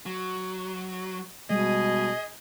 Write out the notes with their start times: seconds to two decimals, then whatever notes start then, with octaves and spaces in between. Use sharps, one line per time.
0.06 F#3
1.50 B2 G3 G#3 G#4 D#5